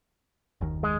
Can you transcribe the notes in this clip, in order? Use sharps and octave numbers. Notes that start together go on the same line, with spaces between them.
F#1 D#2 D#3
G#3